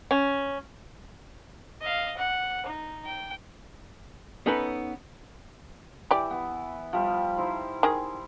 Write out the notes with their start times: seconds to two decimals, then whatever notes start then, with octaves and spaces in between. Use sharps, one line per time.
0.11 C#4
1.82 D#5 F5
2.17 F#5
2.66 D#4
3.06 G5
4.46 B3 C#4 D#4 A4 B4
6.11 E3 G4 D5
6.31 B3
6.93 F3 G3
7.37 D#4 E4 C5
7.83 D#3 G#4